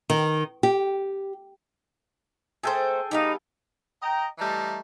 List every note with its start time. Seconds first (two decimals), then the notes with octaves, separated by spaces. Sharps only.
0.10 D#3
0.63 G4
2.63 A3 C4 G#4 A4 C5 G5
3.11 G3 B3 D#4 F5
4.02 D#5 G5 A#5
4.38 E3 G3 A3 D#5 A5 A#5